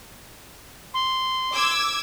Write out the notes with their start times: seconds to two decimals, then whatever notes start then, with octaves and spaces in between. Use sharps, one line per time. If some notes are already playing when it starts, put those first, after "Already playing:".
0.94 C6
1.55 D6 E6 G#6